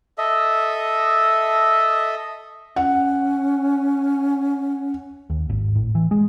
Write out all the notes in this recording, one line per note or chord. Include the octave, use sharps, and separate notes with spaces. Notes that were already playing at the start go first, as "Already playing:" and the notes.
A4 D#5 E5
C#4 F#5
D#2
G#1
A2
E3
G#3